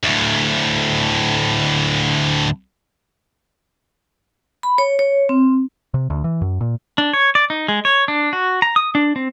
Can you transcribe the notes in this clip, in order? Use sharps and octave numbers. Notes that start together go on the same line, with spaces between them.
D2 A2
B5
C#5
C#5
C4
C3
D2
E3
F#2
A#2
D4
C#5
D5
D#4
G#3
C#5
D4
F#4
A#5
D#6
D4
C4